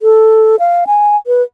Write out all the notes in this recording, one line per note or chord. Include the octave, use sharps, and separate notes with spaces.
A4
F5
G#5
B4